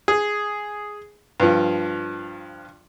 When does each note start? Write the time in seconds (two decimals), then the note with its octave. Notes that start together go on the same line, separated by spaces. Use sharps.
0.08 G#4
1.40 G2 F3